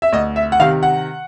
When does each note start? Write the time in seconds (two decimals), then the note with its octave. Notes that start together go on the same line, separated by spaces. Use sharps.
0.02 E5
0.13 D2 D#5
0.36 E5
0.52 F#5
0.59 C3 D#3 F5
0.83 F#5